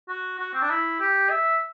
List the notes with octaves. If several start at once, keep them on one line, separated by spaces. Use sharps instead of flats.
F#4
F#4
C4
D4
E4
G4
E5